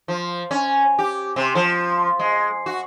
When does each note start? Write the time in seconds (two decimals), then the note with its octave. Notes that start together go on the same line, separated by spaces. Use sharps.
0.08 F3
0.51 C#4
0.99 G4
1.36 C3
1.55 F3
2.19 G#3
2.66 F#4